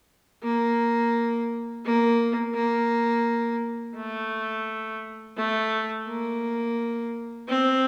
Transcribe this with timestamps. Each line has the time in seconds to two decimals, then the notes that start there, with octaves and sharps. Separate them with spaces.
0.43 A#3
1.85 A#3
2.54 A#3
3.96 A3
5.36 A3
6.07 A#3
7.49 C4